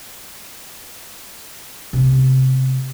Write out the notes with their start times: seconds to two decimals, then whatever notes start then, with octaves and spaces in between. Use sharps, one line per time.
1.93 C3 B3